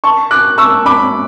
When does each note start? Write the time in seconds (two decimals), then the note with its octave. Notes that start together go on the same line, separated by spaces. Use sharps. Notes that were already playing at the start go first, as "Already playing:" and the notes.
0.04 A5 C#6
0.31 D6 F#6
0.58 C#6 E6
0.86 B5 D6